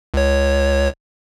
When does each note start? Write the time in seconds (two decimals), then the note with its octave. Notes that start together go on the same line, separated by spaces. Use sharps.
0.14 C#2 C#5